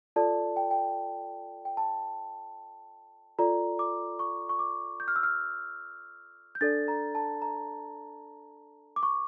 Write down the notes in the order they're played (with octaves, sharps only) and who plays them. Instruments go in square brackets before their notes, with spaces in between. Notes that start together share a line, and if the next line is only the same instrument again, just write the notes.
[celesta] F4 A4 D5 A5
G5
G5
G5
A5
F4 A4 D5 A#5
D6
C#6
C#6
D6
G6
F6
E6
F6
G6
D4 A4 D5 A6
A#5
A5
A#5
D6
C#6